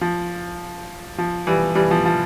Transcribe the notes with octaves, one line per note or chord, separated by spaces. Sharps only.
F3
F3
E3 G3
E3 G3
F3
F3